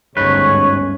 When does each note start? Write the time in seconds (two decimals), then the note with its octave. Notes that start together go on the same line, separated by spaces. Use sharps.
0.17 G1 D2 G#2 C#4 B4 C#5 C#6